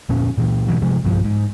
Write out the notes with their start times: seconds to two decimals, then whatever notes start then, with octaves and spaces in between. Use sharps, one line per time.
0.09 F2 A#2 C#4
0.38 A#2 E3
0.68 B2 E3 F#3
0.82 C3 F3 G#3
1.05 B1 G2 F3
1.24 G#2